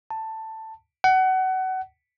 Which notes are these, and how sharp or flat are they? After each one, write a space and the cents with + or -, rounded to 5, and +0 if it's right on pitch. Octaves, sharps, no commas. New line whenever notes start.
A5 +10
F#5 +25